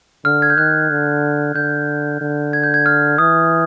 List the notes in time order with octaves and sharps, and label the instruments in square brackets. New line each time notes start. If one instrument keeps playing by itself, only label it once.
[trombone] D3 [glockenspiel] F6
[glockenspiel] G#6
G6
[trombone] D#3 [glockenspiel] F#6
[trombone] D3
[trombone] D3 [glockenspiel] G6
[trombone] D3
[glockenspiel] G#6
G6
G#6
F6
[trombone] E3 [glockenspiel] D#6